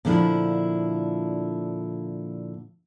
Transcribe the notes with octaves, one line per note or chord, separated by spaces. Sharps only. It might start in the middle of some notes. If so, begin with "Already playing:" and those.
A#2 D3 F3 D4 E4